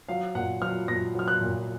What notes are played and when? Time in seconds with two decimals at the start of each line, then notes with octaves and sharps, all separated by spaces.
0.09 F#3 F5
0.35 A#2 F#5
0.62 F#3 F6
0.88 A#2 A#6
1.15 F#3 F6
1.28 F#6
1.41 A#2